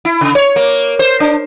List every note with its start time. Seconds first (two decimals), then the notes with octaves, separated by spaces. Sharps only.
0.05 E4
0.21 C#3
0.35 C#5
0.56 A#3
0.99 C5
1.20 D4